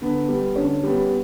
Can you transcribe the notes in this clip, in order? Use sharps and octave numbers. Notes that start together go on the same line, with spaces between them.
D3 B3
G3 B3
D3 C#4
G3 B3